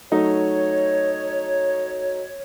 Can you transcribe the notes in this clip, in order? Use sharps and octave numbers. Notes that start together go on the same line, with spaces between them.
F#3 A3 D#4 C#5